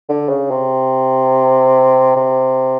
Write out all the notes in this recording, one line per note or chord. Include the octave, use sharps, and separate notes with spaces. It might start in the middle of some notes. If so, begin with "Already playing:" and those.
D3
C#3
C3
C3